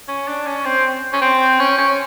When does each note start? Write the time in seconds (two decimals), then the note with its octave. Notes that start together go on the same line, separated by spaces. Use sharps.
0.08 C#4
0.28 D4
0.46 C#4
0.65 C4
1.13 C#4
1.22 C4
1.60 C#4
1.78 C#4